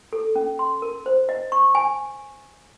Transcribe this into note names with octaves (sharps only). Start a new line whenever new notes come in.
A4
C#4
C6
A#4
C5
D#5
C#6
G#5